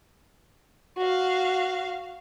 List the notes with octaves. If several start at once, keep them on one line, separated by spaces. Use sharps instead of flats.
F#4 F5